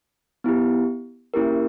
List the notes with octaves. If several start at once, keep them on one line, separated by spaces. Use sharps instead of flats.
B3 E4 G4
A#3 C#4 E4 G4 A#4